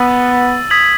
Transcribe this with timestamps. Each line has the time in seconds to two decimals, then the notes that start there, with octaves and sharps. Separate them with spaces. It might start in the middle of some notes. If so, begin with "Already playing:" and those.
Already playing: B3 E6 A6 D#7 F#7
0.70 D#6 G#6 B6 F#7